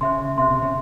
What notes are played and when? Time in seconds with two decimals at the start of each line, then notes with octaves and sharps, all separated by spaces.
0.01 C#3 C5 E5 C6
0.38 C3 C5 E5 C6
0.50 C3
0.62 C#3